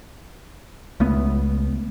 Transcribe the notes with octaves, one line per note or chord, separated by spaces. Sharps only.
C#2 A3 B3